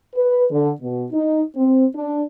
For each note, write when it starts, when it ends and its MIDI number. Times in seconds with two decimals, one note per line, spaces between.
0.15 0.45 71
0.51 0.71 50
0.81 1.05 47
1.12 1.43 63
1.56 1.86 60
1.95 2.22 62